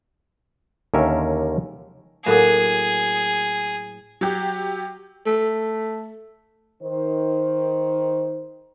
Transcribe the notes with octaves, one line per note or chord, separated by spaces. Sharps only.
D#2 D3 C#4 A#4 E5
A2 F#3 A#3 G#4
F#3 G4
A3
D#3 C5